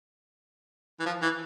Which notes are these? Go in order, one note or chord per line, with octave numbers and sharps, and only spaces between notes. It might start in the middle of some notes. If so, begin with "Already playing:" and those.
E3
F3
E3